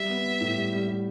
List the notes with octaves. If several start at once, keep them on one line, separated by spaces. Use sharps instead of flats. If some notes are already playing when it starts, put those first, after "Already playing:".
Already playing: G3 E5
B3
B3
A2
G3
G3
G3